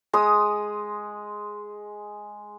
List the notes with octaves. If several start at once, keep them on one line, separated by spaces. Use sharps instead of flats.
G#3 D#6